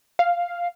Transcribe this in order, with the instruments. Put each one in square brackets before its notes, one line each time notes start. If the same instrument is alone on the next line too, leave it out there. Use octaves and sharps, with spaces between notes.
[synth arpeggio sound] F5